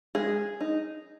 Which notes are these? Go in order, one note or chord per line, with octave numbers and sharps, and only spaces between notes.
G#3 G#4
D#4